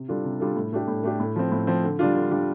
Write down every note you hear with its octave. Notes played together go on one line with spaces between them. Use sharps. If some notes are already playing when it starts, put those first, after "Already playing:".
Already playing: C3
G3 D4 F4 A4
C3
G3 D4 F4 A4
A2
A3 D4 G4
A2
A3 D4 G4
A2
F3 C4
A2
F3 C4
D3
G3 D4 F4
D3
G3 D4 F4